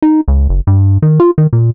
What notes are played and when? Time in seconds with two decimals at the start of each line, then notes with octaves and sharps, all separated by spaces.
0.02 D#4
0.28 C#2
0.49 F#1
0.67 G2
1.02 D#3
1.20 F4
1.38 D#3
1.53 A#2